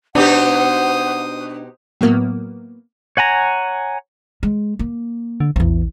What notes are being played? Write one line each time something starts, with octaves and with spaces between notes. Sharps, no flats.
B2 D4 D#4 G4 C5 F#5 D#6
A2 F#3 A#3 B3
C#5 F#5 G#5 A#5
G#3
A#3
D3
A#1 E2 E3